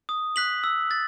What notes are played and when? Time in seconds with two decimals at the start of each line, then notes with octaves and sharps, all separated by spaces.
0.09 D#6
0.36 F#6 B6 F#7
0.64 E6
0.91 A6